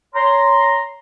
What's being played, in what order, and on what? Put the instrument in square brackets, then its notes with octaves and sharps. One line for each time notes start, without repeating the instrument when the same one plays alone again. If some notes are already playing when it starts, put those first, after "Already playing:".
[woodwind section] C#5 A#5 C6